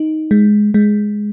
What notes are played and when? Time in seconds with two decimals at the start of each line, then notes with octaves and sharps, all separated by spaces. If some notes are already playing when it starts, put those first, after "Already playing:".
Already playing: D#4
0.31 G#3
0.74 G#3